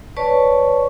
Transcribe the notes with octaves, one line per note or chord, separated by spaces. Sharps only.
B4 C#5 D5 A5 C#6